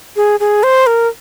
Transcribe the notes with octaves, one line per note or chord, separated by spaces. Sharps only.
G#4
G#4
C5
A#4